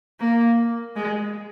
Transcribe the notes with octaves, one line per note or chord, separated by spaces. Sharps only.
A#3
G#3